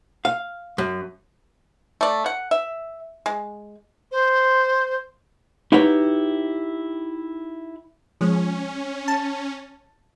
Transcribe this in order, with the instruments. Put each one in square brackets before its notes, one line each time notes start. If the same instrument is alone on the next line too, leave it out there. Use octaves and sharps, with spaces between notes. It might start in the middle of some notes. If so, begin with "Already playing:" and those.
[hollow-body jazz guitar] F5
F#2
[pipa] A3 D5
F#5
E5
G#3
[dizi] C5
[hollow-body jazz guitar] D#4 E4 F#4 G4 B4 C#5
[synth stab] F3 G#3 [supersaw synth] C#4
[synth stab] A5